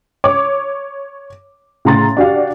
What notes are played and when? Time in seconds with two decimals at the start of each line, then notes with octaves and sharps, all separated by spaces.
0.24 C#5 D6
1.85 A2 C#3 A#5 C6 A6
2.17 D4 F#4 G4 F5